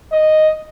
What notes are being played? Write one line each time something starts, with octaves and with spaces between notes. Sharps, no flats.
D#5